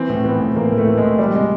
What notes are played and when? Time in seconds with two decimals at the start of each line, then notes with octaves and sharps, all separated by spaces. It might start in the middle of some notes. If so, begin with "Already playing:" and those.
Already playing: E3 C4
0.10 A2
0.24 E3 B3
0.41 A2
0.56 E3 A#3
0.72 A2
0.78 A3
0.87 E3
0.98 G#3
1.04 A2
1.18 F3 G3
1.34 C3 G#3